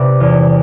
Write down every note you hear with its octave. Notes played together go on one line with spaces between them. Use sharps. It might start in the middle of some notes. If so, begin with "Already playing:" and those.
Already playing: C3 B4 D5
E2